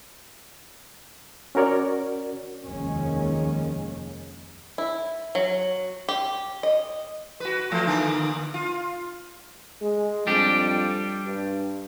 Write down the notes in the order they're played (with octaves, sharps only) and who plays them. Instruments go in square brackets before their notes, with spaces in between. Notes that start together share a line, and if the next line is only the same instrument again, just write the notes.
[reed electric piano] C#4 F#4 A#4 C#5 D5
[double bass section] F1 D#2 D#3 F3 G#3 C#4
[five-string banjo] E4
F#3
G4
D#5
[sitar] F#4 B4
F3 A3 F4
D3 A#3 B3
F4
[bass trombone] G#3
[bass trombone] F2 [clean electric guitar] G3 D4 G4
[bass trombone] G2